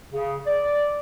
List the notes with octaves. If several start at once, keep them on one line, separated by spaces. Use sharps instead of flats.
C#3
D5